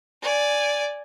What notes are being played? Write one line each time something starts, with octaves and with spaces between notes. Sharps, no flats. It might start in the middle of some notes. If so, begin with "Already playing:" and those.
D5 G#5